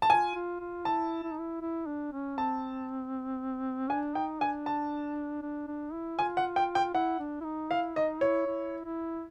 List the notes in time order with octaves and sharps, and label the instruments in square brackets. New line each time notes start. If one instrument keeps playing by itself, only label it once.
[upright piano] A5
[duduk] F4 [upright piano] G#5
[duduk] F4
F4
[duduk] E4 [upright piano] A5
[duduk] E4
D#4
E4
E4
D4
C#4
[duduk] C4 [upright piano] A5
[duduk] D4 [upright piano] G#5
[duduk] D#4 [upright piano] G5
[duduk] D4 [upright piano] G#5
[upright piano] A5
[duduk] D4
D4
E4
[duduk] F4 [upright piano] G#5
[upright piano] F#5
G5
G5
[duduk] E4 [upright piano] F#5
[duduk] D4
E4
D#4
[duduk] E4 [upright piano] F5
[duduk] D#4 [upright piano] D#5
[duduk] E4 [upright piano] C#5
[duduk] E4
E4